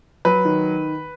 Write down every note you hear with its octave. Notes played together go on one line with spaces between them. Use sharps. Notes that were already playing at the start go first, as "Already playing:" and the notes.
F#3 B4
D#3